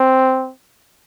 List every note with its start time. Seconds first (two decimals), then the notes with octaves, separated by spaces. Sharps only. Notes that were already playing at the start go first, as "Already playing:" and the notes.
Already playing: C4